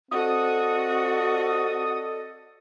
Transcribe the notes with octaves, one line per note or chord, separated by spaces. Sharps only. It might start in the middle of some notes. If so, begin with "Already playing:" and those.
C4 F#4 A4 D5 D#5 D#6